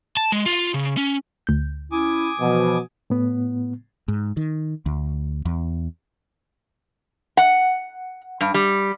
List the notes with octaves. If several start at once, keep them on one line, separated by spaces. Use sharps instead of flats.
A5
G#3
F4
C#3
C#4
D2 G6
C#4 E4 G#5 D6 D#6
B2 E3 F3
A2 B3
G#2
D#3
D2
E2
F#5
G2
G3